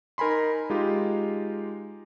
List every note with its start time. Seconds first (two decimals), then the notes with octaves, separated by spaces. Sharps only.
0.18 D#4 A#4 G#5 B5 C6
0.70 G#3 D#4 F4 G4